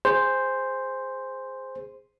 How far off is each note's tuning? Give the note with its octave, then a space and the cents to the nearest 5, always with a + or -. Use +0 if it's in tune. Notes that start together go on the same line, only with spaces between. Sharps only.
G#4 -15 C5 +0